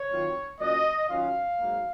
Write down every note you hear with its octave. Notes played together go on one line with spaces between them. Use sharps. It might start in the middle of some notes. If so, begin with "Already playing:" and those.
Already playing: C#5
D#3 F#3 C4 F4
A#2 F#3 C#4 D#5
D#3 F#3 C#4 F4 F5
G#2 F#3 A#3